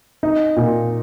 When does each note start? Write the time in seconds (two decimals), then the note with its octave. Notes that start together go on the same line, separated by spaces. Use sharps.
0.23 D#4
0.56 A#2